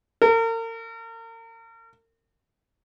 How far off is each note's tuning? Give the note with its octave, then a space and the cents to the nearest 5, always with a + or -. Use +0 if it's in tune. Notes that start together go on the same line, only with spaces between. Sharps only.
A#4 -40